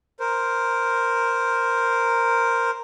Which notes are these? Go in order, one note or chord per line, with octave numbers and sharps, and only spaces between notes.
A#4 C5